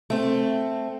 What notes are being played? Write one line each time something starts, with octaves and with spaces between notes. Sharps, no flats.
A3 C4